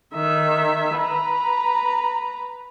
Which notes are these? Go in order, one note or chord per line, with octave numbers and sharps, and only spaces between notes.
D#3 E5
B4 A#5